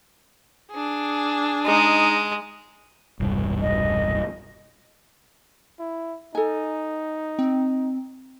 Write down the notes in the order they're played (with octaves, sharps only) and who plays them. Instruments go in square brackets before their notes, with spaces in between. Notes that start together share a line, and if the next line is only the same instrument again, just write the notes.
[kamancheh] D4 G#4
[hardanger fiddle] G#3 [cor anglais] D#4
[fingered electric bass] E1 C2 G2
[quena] D#5
[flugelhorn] E4
[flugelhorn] D#4 [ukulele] A4 G#5
[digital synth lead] C4